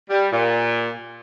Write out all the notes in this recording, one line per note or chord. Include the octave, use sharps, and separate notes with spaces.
G3
A#2